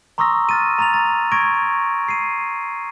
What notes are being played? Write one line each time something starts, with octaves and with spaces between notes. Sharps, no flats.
A#5 C6 C#6 D#6 E6 A#6
F6 A6 D#7
A#5 A6 F7
A6
C#6 G#6 A#6 D7
C7 D#7